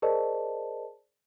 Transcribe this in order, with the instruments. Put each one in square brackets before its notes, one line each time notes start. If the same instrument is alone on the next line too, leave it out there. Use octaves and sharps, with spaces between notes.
[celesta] G#4 A#4 C5 D5 D#5 A5